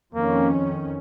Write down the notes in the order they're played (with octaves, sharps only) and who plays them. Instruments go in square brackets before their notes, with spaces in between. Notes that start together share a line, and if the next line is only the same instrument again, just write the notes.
[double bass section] F2 D#3 C#4 [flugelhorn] A#3